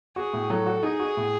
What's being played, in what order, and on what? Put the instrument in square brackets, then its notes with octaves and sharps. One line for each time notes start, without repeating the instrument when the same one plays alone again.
[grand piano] F#4 [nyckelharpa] G#4
[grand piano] A2
[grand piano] F#3 [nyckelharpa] A4
[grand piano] F#4
[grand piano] D#4 [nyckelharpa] G#4
[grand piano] F#4
A2